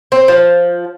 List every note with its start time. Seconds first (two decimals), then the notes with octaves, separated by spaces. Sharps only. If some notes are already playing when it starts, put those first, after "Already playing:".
0.12 C4
0.28 F3